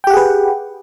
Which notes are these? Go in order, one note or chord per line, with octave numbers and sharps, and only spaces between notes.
G4 G#4 B4 F#5 G5